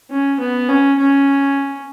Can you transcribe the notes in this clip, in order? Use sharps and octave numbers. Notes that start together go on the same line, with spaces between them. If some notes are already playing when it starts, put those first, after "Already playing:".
C#4
B3
C#4
C#4